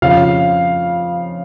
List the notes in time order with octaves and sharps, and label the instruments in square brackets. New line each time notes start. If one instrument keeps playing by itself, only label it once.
[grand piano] F2 C#3 F3 F5